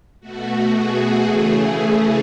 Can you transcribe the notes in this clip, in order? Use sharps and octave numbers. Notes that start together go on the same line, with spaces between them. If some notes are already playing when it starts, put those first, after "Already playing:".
B2 A3 F#4
G#4
C#3 E3 A3